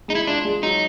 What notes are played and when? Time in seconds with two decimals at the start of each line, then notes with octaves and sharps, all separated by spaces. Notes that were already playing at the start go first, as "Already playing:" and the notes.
0.08 G#3 D#4
0.15 E4
0.27 D4 F4
0.45 G#3
0.63 F#3 D#4